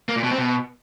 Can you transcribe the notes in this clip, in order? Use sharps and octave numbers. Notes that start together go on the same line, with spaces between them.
A#3
A#2
B2
C4
B2